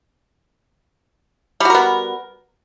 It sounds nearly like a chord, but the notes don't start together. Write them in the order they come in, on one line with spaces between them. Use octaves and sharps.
G3 F#4 A#4 B3